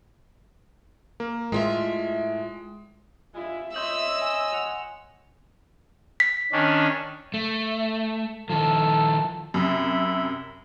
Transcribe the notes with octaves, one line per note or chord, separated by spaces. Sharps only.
A#3
A2 G#3 F4 E5
G2 G#3 E4 F4 E5
C#5 D#5 E5 C6 E6 G6 F#7
G#5
F#5 F7
B6
D#3 C#4 D4
A3
D#3 F3 A4
F#2 C3 E5 B5